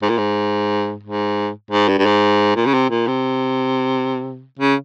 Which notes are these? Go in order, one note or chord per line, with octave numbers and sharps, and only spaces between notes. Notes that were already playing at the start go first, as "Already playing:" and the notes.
G#2
A#2
G#2
G#2
G#2
G2
G2
G#2
A#2
C#3
C3
A#2
C3
C#3